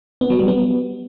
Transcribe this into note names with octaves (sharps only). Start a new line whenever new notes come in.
B3
F#3
G3
B3